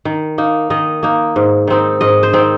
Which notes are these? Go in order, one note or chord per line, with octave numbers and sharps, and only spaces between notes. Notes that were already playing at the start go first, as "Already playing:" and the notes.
D#3
A#3 D#4
D#3 D#5
A#3 D#4
G#2
D#3 C4 D#4
G#2 D#5
C5
D#3 C4 D#4